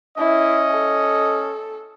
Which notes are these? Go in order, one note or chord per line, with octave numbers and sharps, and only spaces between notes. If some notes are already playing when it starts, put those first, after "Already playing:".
C#4 E4 D#5
A4